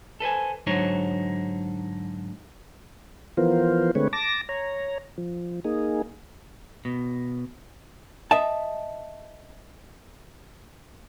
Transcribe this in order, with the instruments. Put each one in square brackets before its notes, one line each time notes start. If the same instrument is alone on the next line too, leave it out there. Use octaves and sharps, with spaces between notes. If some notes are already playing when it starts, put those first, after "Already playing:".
[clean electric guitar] A4 B4 C5 G#5
G#2 D3 F#3 D#4 C5 C#5
[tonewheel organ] E3 F3 B3 F4 A#4 C5
D3 G#3 A3 C4 B4 C#5
A5 D6 A#6
C#5 A#5
F3
A#3 D#4 G#4
[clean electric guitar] B2
[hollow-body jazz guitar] D#5 E5 A5